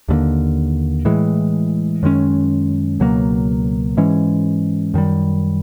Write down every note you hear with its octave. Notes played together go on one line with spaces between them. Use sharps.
D#2 D3 G3 A#3
A2 E3 G#3
F#2 D#3 G#3 C#4
C#2 B2 F#3 A#3
G#2 E3 G#3 C#4
F#2 D#3 G3